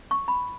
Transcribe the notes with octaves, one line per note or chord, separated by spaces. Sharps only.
C#6
B5